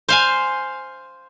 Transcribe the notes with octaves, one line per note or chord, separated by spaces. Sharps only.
C5 F5 G#5